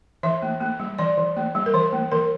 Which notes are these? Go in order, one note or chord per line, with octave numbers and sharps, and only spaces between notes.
E3 E5
A#3
A#3
G3
E3 D5
E3
A#3
G3
A#4
E3 C5
A#3
E3 A#4